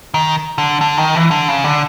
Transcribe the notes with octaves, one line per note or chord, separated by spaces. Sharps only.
D#3
D3
D3
D#3
E3
D3
C#3
D3